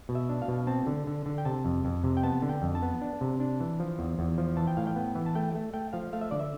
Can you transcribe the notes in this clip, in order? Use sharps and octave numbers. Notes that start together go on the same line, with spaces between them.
B2
E5
D4
F5
B2
C4 A5
D3
D3
D3
G5
C3 A5
F2
F2
C3
G5
B3 A5
D3
G5
F2
A5
B3
D4
C3
D4
E3
F3
E2
E2
F3
E3 A5
G5
A2 F5
G5
B3
E3
A5
A3 G5
A3
A3 G5
F3 F5
A3 F5
E5
D3 D5
E5